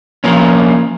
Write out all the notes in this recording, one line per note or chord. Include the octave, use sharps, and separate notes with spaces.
F3 A#3 C#4